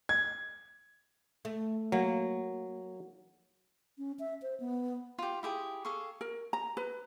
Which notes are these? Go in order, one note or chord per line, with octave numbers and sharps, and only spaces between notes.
G#6
A3
F#3 A#3
C#4
E5
C5
B3
F4 G4
E4 G4 G#4
G#4 A4 F5 C#6
A#4
A#5
B4